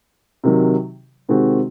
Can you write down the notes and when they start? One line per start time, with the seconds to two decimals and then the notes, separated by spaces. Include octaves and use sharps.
0.44 C3 D#3 F#3
1.29 C3 D#3 G#3 C4 F#4